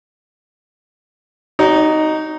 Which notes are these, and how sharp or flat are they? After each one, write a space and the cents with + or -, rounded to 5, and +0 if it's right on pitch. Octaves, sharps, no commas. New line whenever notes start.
D#4 +0 F#4 +40 C#5 +45